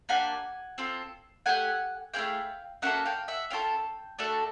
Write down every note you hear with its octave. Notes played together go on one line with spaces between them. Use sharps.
A#3 D4 G4 F#5 G#5
C4 F4 A4
A3 D4 G4 F#5 G#5
A3 C#4 E4 G#4 F5 G5
A#3 C#4 F#4 A4 E5 F#5
F5 G5
E5 F#5
C#4 F4 A4 F5 G5
A3 D4 F#4 A4